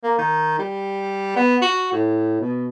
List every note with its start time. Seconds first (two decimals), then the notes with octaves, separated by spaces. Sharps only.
0.04 A#3
0.18 D#3
0.59 G3
1.36 B3
1.62 F#4
1.92 A2
2.40 B2